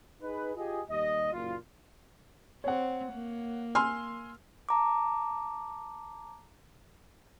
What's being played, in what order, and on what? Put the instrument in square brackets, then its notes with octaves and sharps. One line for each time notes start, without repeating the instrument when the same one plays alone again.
[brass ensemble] D#4 G#4 B4
F4 G4 G#4 D#5 G#5
D#2 G3 D#5
F#1 A#2 F4
[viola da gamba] C4 [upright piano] C#5 F#5
[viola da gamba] A#3
[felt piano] G#5 C6 F6 [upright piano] E6
[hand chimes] A5 A#5 D6